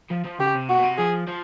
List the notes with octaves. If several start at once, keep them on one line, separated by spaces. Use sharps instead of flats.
F3
F3
C#3 G4
C3
B2 F#4
B2
C3
F3 G#4
F3